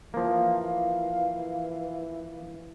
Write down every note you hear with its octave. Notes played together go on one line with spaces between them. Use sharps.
E3 F3 A#3 F5